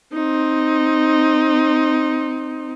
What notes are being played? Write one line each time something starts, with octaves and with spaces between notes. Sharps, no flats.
C4 D#4